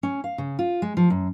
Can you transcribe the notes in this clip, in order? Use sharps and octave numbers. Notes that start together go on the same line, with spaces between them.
C#4
F5
C#3
F4
G#3
F3
F#2